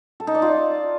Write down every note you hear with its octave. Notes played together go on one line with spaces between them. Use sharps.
A4
D#4
D5
F4